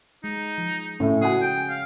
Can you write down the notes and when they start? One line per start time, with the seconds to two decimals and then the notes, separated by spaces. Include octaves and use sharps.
0.24 G#3 D#4
0.58 F3
1.00 A2 C#3 A3 C4 C#4 E5
1.22 C#4 F#4 G#4 F#5 G#5
1.42 G5
1.70 F5